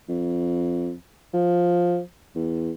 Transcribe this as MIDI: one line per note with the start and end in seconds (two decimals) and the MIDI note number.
0.09 0.93 41
1.34 2.00 53
2.35 2.71 40